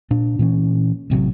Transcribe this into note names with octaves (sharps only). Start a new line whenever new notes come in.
A#2 D4
A#2 E3 C#4
A1 C3 F3 F#3